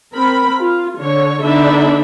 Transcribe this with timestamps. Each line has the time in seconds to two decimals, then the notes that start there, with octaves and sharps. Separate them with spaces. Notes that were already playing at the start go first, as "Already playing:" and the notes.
0.14 C4 A#4 B5
0.60 F4
0.97 D3 C#5
1.42 D3 B3 D4 D#4 E5 B5